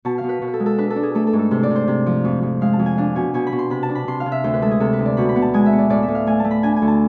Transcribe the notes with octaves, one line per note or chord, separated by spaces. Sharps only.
B2 A5
F5
B2
B4
B2
B4
A4
G#3
A4
D4 B4
A4
D4
G#4
A3 A4
A4
G#2
A4
C3 C5
D5
C3
C5
C3
F3
F2
F2
G#3 F5
A5
F2
G#5
D4 F5
B2 G#5
B2 G#5
B5
B2
C6
C3 B5
A5
D4
B5
C3 C6
F5
C3
E5
D2 C5
B4
G#3 A4
G#4
C3 A4
B4
D2
D5
B2 B5
B5
B3
A5
G#3 G#5
E5
B3
D5
A2 D5
E5
A2
F5
A3 G#5
A3 A5
B5
D4 G#5
G#5
D2
A5